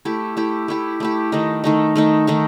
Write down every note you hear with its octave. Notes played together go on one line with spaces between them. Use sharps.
A3 E4 G4
A3 E4 G4
A3 E4 G4
A3 E4 G4
D#3 A3 D#4
D#3 A3 D#4
D#3 A3 D#4
D#3 A3 D#4